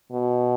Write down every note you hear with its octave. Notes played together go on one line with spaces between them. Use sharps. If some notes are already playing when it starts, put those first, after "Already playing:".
B2